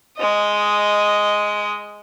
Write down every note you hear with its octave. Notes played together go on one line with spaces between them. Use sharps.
G#3 D#5